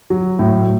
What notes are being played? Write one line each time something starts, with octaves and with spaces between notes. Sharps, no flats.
F#3
A2